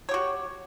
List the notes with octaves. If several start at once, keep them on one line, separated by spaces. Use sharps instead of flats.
F#4 G4 C#5